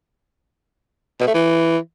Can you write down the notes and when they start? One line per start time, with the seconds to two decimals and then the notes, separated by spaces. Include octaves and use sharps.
1.21 B2
1.27 A3
1.34 E3